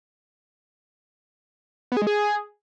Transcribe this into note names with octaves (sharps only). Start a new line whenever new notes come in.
B3
G#4
G#3
G#4